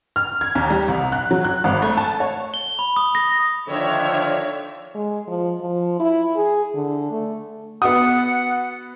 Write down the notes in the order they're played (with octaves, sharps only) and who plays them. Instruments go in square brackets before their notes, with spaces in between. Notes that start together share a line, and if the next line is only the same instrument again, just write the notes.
[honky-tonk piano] F6
G#6
D#2
G3
C2
F#6
F#3
F#6
G#1
A3
A5
C#5
[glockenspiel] G7
B5
D#6
A#6
[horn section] D3 D#3 F3 [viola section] D4 C#5 E5
[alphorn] G#3
F3
F3
E4
G#4
D3
A3
[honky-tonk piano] B3 F#4 [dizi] F#5 [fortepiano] D#6